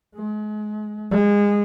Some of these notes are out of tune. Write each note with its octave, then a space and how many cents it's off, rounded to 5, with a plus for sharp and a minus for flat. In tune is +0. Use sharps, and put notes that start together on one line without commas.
G#3 +35
G#3 -25